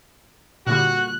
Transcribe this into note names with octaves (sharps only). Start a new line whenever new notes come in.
A#2 D3 G3 F#4 F#6